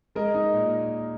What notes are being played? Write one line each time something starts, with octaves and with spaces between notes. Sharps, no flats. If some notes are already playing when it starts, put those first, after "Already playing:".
G#3 A#4 D#5
D#4
A#2